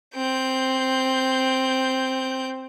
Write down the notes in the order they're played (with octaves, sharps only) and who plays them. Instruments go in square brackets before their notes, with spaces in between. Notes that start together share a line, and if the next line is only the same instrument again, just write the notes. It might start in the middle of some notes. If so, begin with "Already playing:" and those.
[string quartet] C4 G6